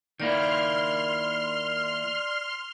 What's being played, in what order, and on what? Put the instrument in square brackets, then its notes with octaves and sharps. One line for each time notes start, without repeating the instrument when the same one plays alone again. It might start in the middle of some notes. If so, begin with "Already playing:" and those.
[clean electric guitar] D#3 A#3 E4 [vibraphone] D5 [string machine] C6 F6